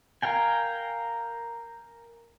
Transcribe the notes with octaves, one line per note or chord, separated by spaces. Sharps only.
A#4 F5 G5 G#5